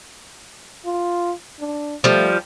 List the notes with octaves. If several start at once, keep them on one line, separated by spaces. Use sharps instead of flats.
F4
D4
F3 G3 A3